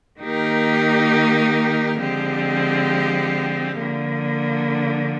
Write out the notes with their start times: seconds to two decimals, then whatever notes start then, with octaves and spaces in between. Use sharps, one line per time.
0.21 D#3 A#3 D#4 G4 A#4
2.00 D3 F3 G#3 C4 G4
3.79 D3 F3 A#3